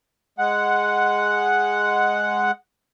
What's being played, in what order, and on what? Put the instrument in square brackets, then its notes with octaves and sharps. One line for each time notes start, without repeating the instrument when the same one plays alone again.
[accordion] G#3 F#5